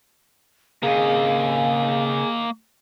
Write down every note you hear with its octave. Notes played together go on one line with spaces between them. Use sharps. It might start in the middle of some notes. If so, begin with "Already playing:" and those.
C#3 A#3 C4 G#4 D#5 F5